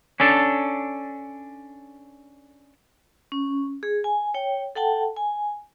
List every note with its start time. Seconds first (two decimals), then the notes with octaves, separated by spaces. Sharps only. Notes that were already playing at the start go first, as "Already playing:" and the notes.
0.20 C#4 D4 A4
3.32 C#4
3.83 G#4
4.04 G#5
4.34 C#5 G5
4.75 A4 F#5 G5 A5
5.17 G#5